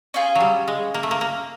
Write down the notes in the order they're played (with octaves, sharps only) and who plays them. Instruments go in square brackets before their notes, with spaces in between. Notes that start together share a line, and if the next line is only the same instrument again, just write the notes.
[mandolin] C#4 F4 G#4
[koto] F#3
G3
G#3
A#3
A3
A#3
A#3